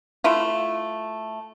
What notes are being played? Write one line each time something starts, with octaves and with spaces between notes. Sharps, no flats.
A3 E4 F4